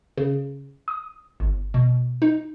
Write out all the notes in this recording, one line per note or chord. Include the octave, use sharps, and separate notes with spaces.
C#3
D#6
G1
B2
D#4